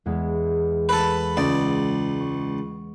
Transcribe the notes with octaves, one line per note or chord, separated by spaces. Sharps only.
E2 G#3 B3
A4 B4 B5
C#2 D5 D#6
C#6